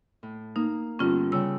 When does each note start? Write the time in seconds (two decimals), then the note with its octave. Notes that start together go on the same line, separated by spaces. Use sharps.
0.23 A2
0.56 A#3 D#4
0.99 G2 D3 B3 C#4 F4
1.32 C#3 G3 G5 E6